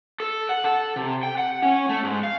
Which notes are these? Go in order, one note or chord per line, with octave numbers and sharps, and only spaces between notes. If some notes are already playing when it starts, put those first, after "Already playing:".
A4
F#5
A4
C3
G5
F#5
C#4
A3
G#2
F5